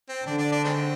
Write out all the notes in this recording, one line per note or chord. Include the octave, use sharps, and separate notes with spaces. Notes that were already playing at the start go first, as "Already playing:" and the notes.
C4
D3 D4
D4
D4
D#3 G#3 C4